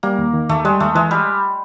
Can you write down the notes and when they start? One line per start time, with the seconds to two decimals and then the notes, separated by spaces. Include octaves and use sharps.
0.03 G3 A#3
0.19 D#2
0.34 D#3
0.49 D#2 A3
0.65 G3 G#3
0.80 D#2 A3
0.95 E3 G#3
1.11 G3